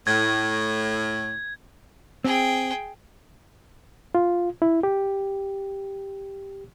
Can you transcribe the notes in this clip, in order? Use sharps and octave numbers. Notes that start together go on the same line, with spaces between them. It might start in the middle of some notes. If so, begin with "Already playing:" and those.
A2 G#6
C4 G#4 G5
F4
E4
G4